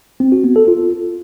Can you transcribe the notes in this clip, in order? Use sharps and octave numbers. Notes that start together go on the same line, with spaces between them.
C4
F#4
B3
A4
F4